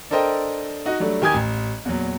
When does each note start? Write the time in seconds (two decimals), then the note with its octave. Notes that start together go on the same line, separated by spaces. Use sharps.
0.10 D4 A4 A#4 C5 D#5 G5
0.86 D#4 F#4 D#5
1.00 F#3 G3 A3 D4
1.22 D#3 G4 G#5 D#6 G#6
1.34 A1
1.85 E2 A#2 F#3